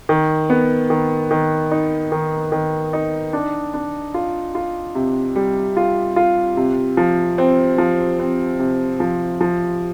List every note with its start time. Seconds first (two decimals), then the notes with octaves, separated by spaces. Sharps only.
0.09 D#3
0.50 B3
0.90 D#3
1.31 D#3
1.71 D#4
2.12 D#3
2.52 D#3
2.93 D#4
3.33 D4
3.74 D4
4.14 F4
4.55 F4
4.95 C3
5.36 G3
5.77 F4
6.16 F4
6.57 C3
6.97 F3
7.38 C4
7.78 F3
8.19 C4
8.59 C3
9.00 F3
9.41 F3